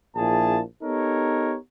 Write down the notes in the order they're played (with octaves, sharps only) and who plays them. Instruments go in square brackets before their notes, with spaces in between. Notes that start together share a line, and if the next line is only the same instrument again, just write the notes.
[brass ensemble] A#1 A#2 E4 G#4 A5
B3 D#4 G4 A4 A#4 C#5